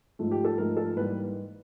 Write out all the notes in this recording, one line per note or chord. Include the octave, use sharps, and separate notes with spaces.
G#2 F3 A3
G4
A4
G#2 F3 A3 A#4
A4
G#2 E3 G3 A#3 B4